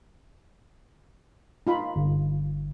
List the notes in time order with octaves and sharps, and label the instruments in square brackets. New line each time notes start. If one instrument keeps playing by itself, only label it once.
[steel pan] D#4 F4 B5
[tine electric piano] G1